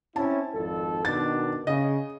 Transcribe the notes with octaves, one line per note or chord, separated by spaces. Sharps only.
C4 C#4 E4 A5
G#1 F2 A4
B2 D#3 D4 A6
C#3 D#5